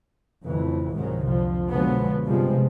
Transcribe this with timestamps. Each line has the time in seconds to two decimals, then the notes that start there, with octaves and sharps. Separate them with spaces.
0.43 F2 A2 C#3 E3
0.93 C2 G#2 C3 D#3 F#3
1.26 F2 D3 F3
1.70 B2 D3 F3 F#3 G#3 B3
2.26 G2 C3 F3 G3 G#3